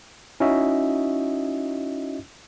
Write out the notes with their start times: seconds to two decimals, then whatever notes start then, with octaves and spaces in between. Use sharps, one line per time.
0.40 C#4 D#4 E4 F#4 D#5 E5